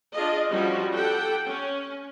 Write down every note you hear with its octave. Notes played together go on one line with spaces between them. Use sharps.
D4 F4 G#4 D#5
F3 G3 C#4 F#4
G4 A4 F#5 G5
C#4